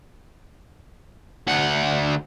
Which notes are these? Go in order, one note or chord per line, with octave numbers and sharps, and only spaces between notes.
D2 F#5